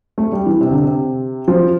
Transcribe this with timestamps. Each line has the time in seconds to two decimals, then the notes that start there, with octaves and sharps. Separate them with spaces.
0.18 A3
0.32 G3
0.46 E3
0.61 C3
0.71 D3
0.82 C3
1.48 F3